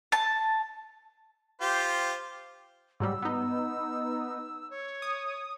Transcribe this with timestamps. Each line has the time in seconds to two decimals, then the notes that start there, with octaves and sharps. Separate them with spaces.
0.12 A5
1.61 F4 G4 C5
3.00 G#2 F#3 G3 E6
3.22 B3 D#4
4.70 C#5
5.02 D#6